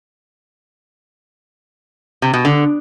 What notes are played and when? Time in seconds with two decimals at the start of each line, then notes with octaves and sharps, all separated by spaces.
2.22 C3
2.34 B2
2.45 D3